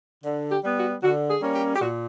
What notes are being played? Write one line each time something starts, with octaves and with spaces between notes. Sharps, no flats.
D3
G4
G3 B3
F#4
D3 F#4
G#4
G3 A#3 C#4
G4
G4
A#2 F#4